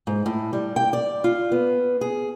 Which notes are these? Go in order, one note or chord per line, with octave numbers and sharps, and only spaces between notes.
G#2
A2
G3
G5
D5
F4
B3
G#4